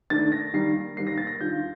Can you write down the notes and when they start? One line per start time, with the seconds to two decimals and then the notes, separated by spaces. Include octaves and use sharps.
0.10 D#3 A3 D4 A6
0.32 A#6
0.54 D#3 G3 A#3 C7
0.97 D#3 G3 A#3 C7
1.07 A#6
1.18 A6
1.27 A#6
1.41 D#3 G3 D4 F4 G6